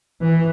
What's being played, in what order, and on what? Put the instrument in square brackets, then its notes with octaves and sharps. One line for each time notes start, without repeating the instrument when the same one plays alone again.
[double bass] E3